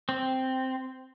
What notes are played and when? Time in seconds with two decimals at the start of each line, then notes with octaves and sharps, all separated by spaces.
0.09 C4